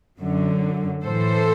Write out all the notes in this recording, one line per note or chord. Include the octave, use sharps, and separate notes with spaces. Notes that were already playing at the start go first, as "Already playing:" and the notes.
F#2 D3 F#3
A2 E3 A4 C5